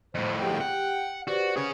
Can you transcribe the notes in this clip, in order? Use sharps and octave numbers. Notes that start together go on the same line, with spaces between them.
F2 A2 C5
G4 G#4 F#5 G5
G4 F#5
F#4 G4 B4 C5 D5
C#4 G#4 C#5